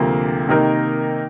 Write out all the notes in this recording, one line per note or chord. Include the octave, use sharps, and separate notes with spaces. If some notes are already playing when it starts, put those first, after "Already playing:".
Already playing: D2 C3 F3 A#3
C3 D#3 A#3 D#4 A#4